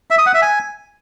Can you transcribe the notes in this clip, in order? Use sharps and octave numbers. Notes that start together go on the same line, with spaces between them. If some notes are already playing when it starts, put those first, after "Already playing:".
E5
D#6
F#5
E5
G#5